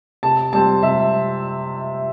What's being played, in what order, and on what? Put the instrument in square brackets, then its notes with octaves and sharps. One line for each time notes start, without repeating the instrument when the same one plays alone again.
[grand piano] C3 A5
G3 C4 A5
C3 E5